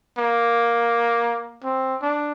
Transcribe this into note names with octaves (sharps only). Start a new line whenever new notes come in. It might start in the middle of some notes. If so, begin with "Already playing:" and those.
A#3
C4
D4